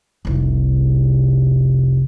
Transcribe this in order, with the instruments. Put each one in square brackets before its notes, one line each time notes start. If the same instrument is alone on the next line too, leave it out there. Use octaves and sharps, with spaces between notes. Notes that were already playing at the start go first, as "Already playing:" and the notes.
[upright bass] F1 C2